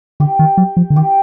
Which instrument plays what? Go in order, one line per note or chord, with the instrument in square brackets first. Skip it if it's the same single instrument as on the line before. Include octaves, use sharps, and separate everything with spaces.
[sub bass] D3 [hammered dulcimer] G4
[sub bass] D#3
F#3
F3
D3
[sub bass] D#3 [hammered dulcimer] G4